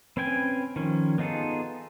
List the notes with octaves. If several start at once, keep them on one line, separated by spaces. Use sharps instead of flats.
C4 C#4 B4 G5 G#5
D#3 F3 C#4
B3 D#4 F4 G#4 A4